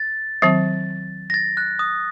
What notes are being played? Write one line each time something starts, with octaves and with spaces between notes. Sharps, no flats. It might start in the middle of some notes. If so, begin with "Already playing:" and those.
Already playing: A6
D#3 F#3 C4
A#6
A6
F#6
D#6